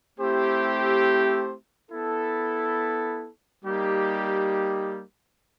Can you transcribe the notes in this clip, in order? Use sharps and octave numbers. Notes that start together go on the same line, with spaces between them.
A3 C4 E4 G4 C5
B3 E4 A4
G3 A#3 D#4 G4